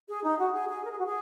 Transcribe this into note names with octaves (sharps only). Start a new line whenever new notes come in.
G#4
D#4
F#4
G#4
G#4
A#4
G#4
F#4
G#4